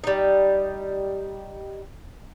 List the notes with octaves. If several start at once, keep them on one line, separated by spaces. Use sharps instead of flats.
G3 D#4